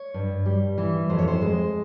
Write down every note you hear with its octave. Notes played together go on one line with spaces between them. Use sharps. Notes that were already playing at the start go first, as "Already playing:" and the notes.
Already playing: C#5
G2
G3
E3
F2 C5
C#5
C5
G#3